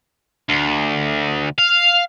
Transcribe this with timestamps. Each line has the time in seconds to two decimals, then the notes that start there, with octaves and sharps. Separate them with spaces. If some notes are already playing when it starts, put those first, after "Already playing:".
0.49 D2
1.59 F5